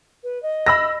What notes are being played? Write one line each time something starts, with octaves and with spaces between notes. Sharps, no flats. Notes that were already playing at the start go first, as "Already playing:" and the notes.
B4
D#5
B5 E6 A#6